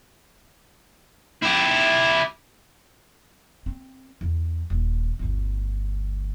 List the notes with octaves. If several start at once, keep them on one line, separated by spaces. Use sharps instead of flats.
E4 G4
C4
E2
D#1
G1 D2